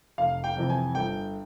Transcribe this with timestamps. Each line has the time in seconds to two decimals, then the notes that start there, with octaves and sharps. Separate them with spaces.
0.18 F1 F5
0.44 G5
0.57 F2 C3 E3
0.70 G#5
0.95 G1 G5